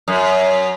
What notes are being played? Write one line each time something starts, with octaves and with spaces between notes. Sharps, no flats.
F#2